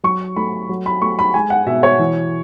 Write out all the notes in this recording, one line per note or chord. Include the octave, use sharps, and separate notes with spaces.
F#3 C#6
A3 B5
F#3
B5
A3 C#6
B5
G#3 G#5
F#5
B2 E5
C#5
E3